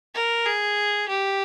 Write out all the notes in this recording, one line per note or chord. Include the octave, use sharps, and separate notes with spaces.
A#4
G#4
G4